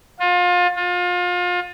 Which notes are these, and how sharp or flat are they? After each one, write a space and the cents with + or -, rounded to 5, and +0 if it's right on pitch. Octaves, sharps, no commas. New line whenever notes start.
F4 +30
F4 +30